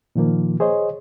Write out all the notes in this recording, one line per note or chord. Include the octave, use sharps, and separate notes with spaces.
A#2 D#3 F3 A#3
G#4 C5 C#5 D#5